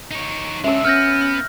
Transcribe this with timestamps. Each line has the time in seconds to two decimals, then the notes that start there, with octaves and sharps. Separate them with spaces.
0.11 D#4 C#5
0.64 G#3 C#4 D4 E5 E6
0.85 B3 C#4 F6 G6 A#6